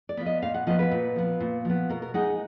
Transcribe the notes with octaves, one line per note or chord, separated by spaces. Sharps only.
D5
F3 B3
D#5
A#2 F5
F#5
F3 B3 D#5
B4
A#2
F3 B3
A#2
F3 B3
B2 A#4
A#4
G#3 D#4 F#5